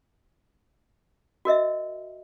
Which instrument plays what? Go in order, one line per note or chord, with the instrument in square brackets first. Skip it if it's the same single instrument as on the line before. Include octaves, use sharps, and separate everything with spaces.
[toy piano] F#4 A#4 D#5 E5